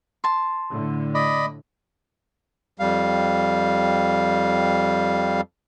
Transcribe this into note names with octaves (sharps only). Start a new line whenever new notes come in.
A5 C6
A2 D3
D5 D#5 B5
F2 G3 F5